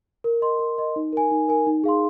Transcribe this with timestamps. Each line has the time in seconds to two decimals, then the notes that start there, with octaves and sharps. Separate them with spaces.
0.24 A#4
0.42 D#5 C6
0.59 A#4
0.78 D#5 C6
0.96 D#4
1.13 A#4 G#5
1.31 D#4
1.49 A#4 G#5
1.67 D#4
1.84 G#4 F5 C6